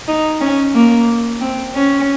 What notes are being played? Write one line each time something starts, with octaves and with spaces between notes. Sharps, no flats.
D#4
C#4
A#3
C4
C#4